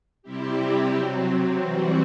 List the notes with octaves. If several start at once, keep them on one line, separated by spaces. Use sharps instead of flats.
C3 G3 C4 E4 G4
C3 F#3 C4
E3 G3 C4 F#4